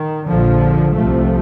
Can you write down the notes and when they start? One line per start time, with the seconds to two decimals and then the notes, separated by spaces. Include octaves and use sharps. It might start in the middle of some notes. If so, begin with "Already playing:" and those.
Already playing: D#3
0.27 A#1 A#2 D3 F3
0.96 C2 C3 F3 A3